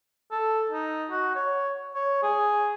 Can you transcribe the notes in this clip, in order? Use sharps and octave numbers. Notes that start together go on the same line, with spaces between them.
A4
D#4
F#4
C#5
C#5
G#4